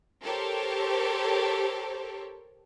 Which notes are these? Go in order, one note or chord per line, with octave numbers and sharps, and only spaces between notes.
G4 A4 A#4 C5 C#5